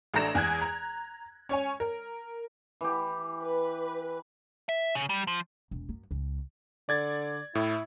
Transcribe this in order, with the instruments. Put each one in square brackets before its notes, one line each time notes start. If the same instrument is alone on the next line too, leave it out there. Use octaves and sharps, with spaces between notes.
[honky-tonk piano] A1 A3 D4 A#5 A#6 E7
E2 G#5 F#6 G#6
A#5
C#4 C#5 G#5
A#4
[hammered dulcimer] E3 G4
[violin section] B4
[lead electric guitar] E5
C#3
G3
F3
[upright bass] E1
F#2
C#2
[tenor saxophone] D3 [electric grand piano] D5 G#6 A6
[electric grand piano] A2 [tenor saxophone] E4